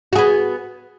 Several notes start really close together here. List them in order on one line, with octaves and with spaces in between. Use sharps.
F#4 G#4 B3